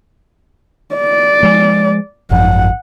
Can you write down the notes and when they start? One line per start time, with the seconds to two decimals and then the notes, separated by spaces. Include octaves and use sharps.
0.95 D5
1.43 F3 G#3
2.31 G#1 F#2 F3 F#5